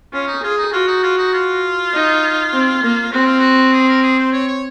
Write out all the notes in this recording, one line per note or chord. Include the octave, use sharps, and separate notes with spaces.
C#4 F4
D#4
F4 G#4
D#4
F4 F#4
D#4
F4
D#4
F4
D#4
C4
A#3
C4 F#4
F4
F#4
G#4
A#4
G#4
C5
C#5
C#5